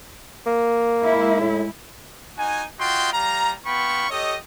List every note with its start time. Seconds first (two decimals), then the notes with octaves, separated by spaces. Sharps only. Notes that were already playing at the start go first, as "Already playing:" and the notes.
0.46 A#3
1.01 G#3 E4
1.41 A2
2.37 D#4 F#4 G#5
2.79 F4 F#4 D#5 G5 C6
3.13 G3 F5 A#5
3.66 B3 F4 G5 B5 C#6
4.09 G4 A4 C#5 D#5